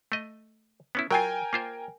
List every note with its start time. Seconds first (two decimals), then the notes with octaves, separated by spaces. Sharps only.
0.12 A3 D#5
0.95 B3 C#4 E4
1.11 F#3 F4 A#4 G5 G#5
1.53 A#3 F4 C5